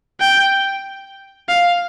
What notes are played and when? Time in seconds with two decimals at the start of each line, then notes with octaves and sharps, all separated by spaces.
0.20 G5
1.49 F5